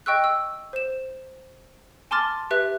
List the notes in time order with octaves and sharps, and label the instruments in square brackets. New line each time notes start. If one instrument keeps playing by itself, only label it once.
[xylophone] D#5 G5 C#6 E6 F#6
E6
C5 E7
G#5 A5 C6 D6 F6 A6
G4 B4 E5 F#6